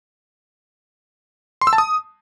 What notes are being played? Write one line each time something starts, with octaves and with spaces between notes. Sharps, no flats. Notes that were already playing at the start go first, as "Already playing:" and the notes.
C6
E6
A5
D#6